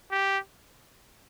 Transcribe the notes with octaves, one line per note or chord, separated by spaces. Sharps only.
G4